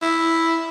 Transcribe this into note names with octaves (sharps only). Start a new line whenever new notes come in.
E4